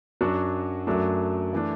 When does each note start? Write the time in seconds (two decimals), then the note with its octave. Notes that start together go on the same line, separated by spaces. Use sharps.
0.21 F#2 F#3 D4 F#4
0.87 F#2 F#3 A3 D4
1.53 E3 A3 D4